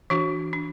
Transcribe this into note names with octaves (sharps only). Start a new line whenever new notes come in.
E3 D4 F#4
D4